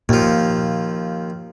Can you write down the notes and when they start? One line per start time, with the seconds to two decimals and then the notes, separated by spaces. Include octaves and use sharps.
0.09 D#2 A#2 F3